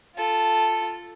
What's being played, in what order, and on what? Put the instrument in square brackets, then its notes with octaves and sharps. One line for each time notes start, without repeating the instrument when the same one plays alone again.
[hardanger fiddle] F4 A4